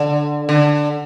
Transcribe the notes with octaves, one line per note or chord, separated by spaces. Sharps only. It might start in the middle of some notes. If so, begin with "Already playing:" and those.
Already playing: D3
D3